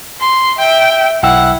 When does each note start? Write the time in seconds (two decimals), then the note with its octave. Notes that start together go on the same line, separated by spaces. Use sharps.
0.20 C6
0.59 E5 G5
1.23 B1 E4 F#5 G5 E6